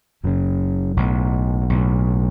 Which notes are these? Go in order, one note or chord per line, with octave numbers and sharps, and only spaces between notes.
F#1 F#2 C#3
B1 A2
B1 A2